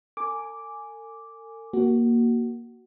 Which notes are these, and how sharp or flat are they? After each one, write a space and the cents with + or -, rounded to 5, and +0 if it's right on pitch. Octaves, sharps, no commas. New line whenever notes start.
A4 +45 G#5 +0 D6 -5
A#3 +10 F#4 +15